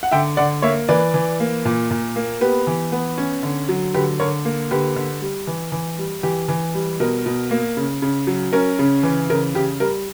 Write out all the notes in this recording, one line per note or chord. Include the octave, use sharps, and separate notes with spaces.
F#5
D3 E5 G5
D3 D5 F#5
A#3 C#5 E5
E3 B4 D5
E3
A#3
A#2
A#2
A#3
B3 G4 B4
E3
B3
C#4
D3
F#3
D3 G4 B4
D3 A#4 C#5
A#3
D3 G4 B4
D3
G3
E3
E3
G3
E3 G4
E3
G3
B2 A#4
B2
A#3
C#3
C#3
F#3
C#4 A#4
C#3
E3
C#3 A#4
C#3 G4
G3 A#4